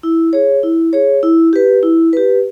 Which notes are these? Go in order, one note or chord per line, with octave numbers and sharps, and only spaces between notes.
E4
G#4 C#5
E4
G#4 C#5
E4
G4 B4
E4
G4 B4